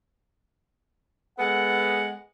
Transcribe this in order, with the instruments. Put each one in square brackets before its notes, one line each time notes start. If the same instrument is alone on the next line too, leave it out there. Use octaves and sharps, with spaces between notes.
[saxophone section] G#3 B3 A4 [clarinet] F#5